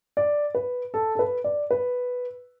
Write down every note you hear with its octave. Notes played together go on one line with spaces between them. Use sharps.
D5
B4
A4
A4
B4
D5
B4